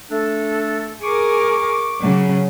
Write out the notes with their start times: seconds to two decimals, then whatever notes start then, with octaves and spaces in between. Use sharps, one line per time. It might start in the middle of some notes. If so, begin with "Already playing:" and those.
0.11 A3 D4 A4
1.03 G#4 A#4 C#6 D6
2.01 C#3 F#3